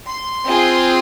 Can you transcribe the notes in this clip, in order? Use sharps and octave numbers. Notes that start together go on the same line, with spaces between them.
C6
C4 F4 G#4